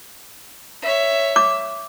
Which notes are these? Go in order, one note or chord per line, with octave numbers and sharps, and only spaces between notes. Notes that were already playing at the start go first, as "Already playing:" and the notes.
C#5 E5
D6